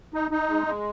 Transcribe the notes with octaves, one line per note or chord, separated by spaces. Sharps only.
D#4
D#4
G#3
G#3